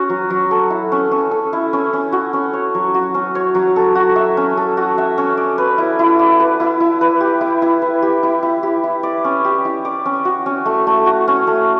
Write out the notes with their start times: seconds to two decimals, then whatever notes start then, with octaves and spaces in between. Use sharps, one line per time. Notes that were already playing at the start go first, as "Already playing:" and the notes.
Already playing: C#4 F#4
0.10 F#3
0.30 F#3
0.51 A4
0.70 E4
0.92 C#4
1.11 C#4
1.31 A4
1.53 E4
1.73 C#4
1.93 C#4
2.12 F#4
2.33 C#4
2.53 C#5
2.75 F#3
2.94 F#4
3.14 C#4
3.35 C#5
3.55 F#3
3.76 A4
3.95 F#4
4.16 E5
4.37 C#4
4.57 A4
4.77 F#4
4.98 E5
5.18 C#4
5.37 D5
5.58 B4
5.78 E4
5.99 E4
6.19 D5
6.40 B4
6.60 E4
6.80 E4
7.01 B4
7.20 G4
7.41 E4
7.62 E4
7.82 B4
8.02 G4
8.23 E4
8.43 E4
8.63 G4
8.84 E4
9.03 D5
9.24 C#4
9.45 G4
9.65 E4
9.85 D5
10.05 C#4
10.25 F#4
10.46 C#4
10.65 A3
10.87 A3
11.06 F#4
11.28 C#4
11.47 A3